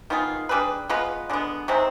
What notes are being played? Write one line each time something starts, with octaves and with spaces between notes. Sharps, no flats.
D#3 B3 F4 G#4
G3 D4 G#4 B4
G#3 B3 F4 B4
D3 G#3 B3
C3 D#3 G#3 C4